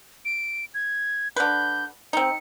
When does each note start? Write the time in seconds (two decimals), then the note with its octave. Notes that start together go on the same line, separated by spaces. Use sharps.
0.25 D7
0.74 G#6
1.36 D3 B4 G6
2.13 C4 D#4 C#7